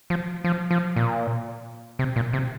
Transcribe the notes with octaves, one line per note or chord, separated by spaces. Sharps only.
F3
F3
F3
A#2
C3
A#2
C3